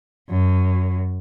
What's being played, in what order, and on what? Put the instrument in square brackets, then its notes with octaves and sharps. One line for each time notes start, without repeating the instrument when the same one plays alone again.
[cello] F#2